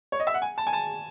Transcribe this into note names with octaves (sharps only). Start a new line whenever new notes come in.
C#5
D#5
E5
F#5
G#5
A5
G#5
A5